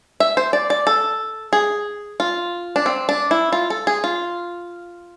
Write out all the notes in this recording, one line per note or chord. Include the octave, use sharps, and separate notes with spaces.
E5
C5
D5
D5
A4
G#4
F4
D4
C4
D4
E4
F4
A4
G#4
F4